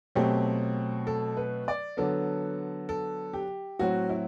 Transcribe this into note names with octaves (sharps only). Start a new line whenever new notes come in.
B2 F#3 A3 C4 G4
A4
B4
D5
D3 F#3 B3 A4
A4
G4
A2 F#3 C4 F#4
E4